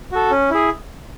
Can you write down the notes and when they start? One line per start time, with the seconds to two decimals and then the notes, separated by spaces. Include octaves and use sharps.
0.12 F#4 A4
0.31 C#4
0.50 E4 G#4